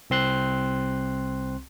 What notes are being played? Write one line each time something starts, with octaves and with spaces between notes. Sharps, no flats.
C2 C4 C6 F#6